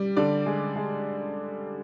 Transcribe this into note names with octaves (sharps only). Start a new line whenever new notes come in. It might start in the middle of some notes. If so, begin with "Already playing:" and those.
Already playing: G3
D3 D5
G#3
G#3